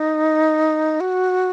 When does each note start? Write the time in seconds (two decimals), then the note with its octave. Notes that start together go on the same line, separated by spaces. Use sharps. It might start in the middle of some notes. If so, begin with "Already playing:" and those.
Already playing: D#4
1.00 F#4